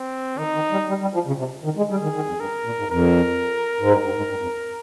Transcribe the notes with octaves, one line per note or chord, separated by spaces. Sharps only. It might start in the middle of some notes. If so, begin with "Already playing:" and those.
Already playing: C4
D#3 D#4
D#3
G3
G3
G3
F3
C#3
C3
D#3
G#3
G3 G#4
D#3
D#3
F2
G2 A#4
A#2
G#2
F2 A#4
G#2
G2 A#4
G2
G#2
G2
F2